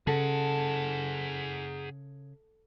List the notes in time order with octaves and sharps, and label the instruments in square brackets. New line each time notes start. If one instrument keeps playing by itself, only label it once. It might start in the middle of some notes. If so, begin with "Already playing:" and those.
[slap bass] C#3 [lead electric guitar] G#4 F#5 [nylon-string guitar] A4